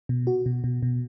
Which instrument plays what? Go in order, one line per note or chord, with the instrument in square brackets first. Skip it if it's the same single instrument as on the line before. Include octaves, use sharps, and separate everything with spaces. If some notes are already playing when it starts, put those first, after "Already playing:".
[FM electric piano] B2
F#4
B2
B2
B2